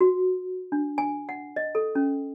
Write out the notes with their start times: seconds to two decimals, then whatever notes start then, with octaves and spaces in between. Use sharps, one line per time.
0.01 F#4
0.72 D4
0.98 G#5
1.29 F#5
1.56 D#5
1.75 A4
1.95 C#4